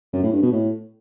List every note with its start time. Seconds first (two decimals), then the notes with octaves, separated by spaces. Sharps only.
0.13 F#2
0.23 A2
0.33 G2
0.42 B2
0.52 A2